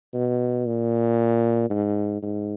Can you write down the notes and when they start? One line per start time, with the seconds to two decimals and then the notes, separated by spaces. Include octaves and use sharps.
0.14 B2
0.66 A#2
1.70 G#2
2.22 G#2